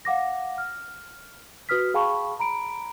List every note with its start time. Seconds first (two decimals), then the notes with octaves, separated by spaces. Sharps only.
0.05 F5 F#5 D6 A#6
0.58 F6
1.69 F#4 B4 D#6 F6 B6
1.94 G#4 F5 G5 A5 B5 C#6
2.39 A#5 B5 D7